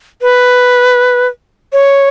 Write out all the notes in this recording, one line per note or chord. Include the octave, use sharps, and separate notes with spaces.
B4
C#5